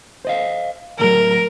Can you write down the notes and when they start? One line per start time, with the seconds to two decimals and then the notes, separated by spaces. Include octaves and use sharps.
0.25 C5 D#5 F5
0.99 D#2 A2 F#3 A#4